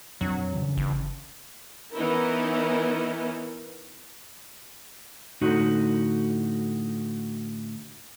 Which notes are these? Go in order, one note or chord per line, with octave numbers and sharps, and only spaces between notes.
F2 F#3 C4 D4
C#3 E3
G1
E3 B3 C#4 D#4 E4 A#4
A2 D3 D#4 F#4